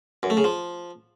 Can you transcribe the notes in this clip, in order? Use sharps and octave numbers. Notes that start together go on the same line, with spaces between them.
F#2
A3
C#3
F3